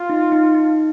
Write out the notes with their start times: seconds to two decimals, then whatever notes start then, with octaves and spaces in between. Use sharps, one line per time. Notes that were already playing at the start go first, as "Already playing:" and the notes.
Already playing: F4
0.10 D#4
0.32 D#4
0.55 D#4